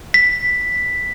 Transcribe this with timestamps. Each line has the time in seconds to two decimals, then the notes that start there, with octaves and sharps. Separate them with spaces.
0.14 B6